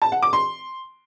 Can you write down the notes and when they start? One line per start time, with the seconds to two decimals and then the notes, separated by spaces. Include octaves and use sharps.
0.02 A5
0.12 F#5
0.23 D6
0.33 C6